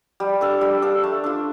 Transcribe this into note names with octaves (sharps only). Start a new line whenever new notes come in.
G3
D4 A4 F5
G3
D4 A4 F5
A3
D4 F4